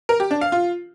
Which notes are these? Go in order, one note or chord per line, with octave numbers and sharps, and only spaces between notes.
A#4
G4
D4
F5
F4